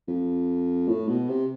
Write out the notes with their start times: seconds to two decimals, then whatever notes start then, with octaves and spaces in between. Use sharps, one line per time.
0.08 F2
0.88 A2
1.08 B2
1.29 C3